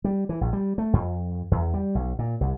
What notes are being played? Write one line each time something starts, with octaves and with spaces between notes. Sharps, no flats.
G3
E3
A#1
G3
A3
F2
E2
G3
B1
A#2
C2